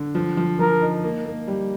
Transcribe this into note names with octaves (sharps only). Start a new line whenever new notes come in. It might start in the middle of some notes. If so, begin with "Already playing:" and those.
Already playing: D3
F3
F3
F3 A#4
D#4
A#3
A#3
G3